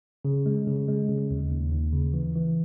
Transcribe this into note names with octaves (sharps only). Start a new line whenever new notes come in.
C#3
G#3
C#3
G#3
C#3
D#2
D#2
D#2
C#3
E3
E3